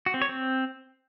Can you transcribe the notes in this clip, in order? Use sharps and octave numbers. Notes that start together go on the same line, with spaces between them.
F#4
C4
C#5
C4